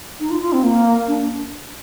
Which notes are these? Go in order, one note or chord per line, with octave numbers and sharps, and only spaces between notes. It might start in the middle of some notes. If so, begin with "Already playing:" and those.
D#4
F4
F4
C4
A#3
D4